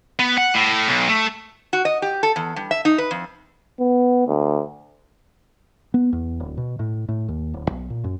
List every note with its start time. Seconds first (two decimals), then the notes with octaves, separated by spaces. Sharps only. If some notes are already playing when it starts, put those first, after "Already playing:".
0.19 B3
0.38 F#5
0.55 A2
0.88 B1
1.09 A3
1.73 F#4
1.85 D#5
2.02 G4
2.23 A4
2.36 E2
2.56 G2
2.71 E5
2.85 D#4
2.98 B4
3.11 F2
3.80 B3
4.28 D2
5.94 B3
6.13 E2
6.40 D1
6.58 B2
6.79 A2
7.09 A2
7.28 D#2
7.54 D1
7.70 B1
7.90 A#2
8.04 F#2